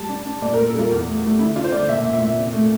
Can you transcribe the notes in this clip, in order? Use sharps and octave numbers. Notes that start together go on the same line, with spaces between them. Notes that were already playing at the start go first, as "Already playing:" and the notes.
Already playing: G3 A5
D4
D4
A#2 D5
A#4
A#2
A4
G3 F4
E2
A3
A3
D3 E4
D4 F4
C5
D3 D5
A#2 E5
A#2
E5
A#2
C3
A3